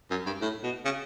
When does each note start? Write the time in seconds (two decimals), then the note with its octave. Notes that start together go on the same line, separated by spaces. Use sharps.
0.11 F#2
0.26 G2
0.41 A2
0.63 B2
0.85 C#3